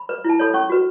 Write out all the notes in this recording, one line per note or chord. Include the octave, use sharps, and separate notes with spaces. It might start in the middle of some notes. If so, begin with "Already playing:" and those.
Already playing: B5
B4
E4 A5
A4 C#5 B5
C#4 C#6
F#4 B4